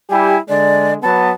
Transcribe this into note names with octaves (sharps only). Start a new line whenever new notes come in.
G3 E4 G4 G#5
D3 G#3 D5
F#3 B3 A5